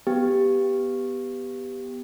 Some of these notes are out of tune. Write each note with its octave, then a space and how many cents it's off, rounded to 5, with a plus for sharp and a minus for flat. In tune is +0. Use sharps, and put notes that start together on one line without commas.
B3 +0 G4 +0